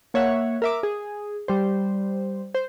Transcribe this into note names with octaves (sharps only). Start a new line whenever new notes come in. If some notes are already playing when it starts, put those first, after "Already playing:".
A#3 C#5 E5 F#5
A#4 E5 D6
G#4
G3 C5
C5